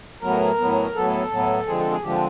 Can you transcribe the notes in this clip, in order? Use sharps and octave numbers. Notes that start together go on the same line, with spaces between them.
A2 F#3 B3 A#4
A2 F#3 B3
A2 F#3 B3 A4
A2 F#3 B3
D3 F3 G#3 C4 G#4
A4
G#4
D3 F3 G#3 C4 G4